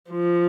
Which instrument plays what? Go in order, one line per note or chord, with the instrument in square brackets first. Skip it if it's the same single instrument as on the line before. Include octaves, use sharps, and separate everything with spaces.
[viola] F3